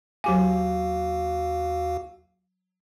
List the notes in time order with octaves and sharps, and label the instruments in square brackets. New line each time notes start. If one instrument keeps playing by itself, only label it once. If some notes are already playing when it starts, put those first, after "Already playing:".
[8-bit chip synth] D#2 F#4 F5 [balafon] F#3 G4 G#5